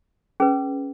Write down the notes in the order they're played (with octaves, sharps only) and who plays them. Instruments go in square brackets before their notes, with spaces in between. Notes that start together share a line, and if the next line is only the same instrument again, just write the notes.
[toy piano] C#4 G#4 B4